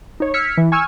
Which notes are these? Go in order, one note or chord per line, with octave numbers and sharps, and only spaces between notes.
D#4 C#5
E6 F6 G#6 B6 C#7
E3
G#5 C#6 E6 F6 G#6